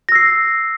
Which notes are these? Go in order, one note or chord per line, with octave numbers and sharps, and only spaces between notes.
E6 A#6 C7